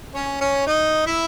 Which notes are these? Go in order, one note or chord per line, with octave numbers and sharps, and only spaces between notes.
C#4 C#5
C#4 C#5
D#4 D#5
E4 E5